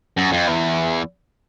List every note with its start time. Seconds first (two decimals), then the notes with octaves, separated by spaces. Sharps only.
0.18 F#2
0.33 F2
0.48 E2